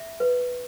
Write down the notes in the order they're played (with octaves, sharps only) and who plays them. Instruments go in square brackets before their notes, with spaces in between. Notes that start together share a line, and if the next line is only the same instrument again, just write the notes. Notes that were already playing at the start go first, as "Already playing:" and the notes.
Already playing: [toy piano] E5
B4